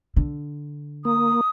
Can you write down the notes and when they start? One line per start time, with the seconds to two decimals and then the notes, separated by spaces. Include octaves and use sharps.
0.16 D3
1.05 A#3 D#6